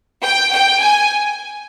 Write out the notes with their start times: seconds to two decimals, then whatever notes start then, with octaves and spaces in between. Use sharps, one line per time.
0.23 G5
0.52 G5
0.82 G#5